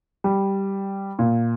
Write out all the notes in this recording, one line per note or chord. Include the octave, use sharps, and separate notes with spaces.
G3
A#2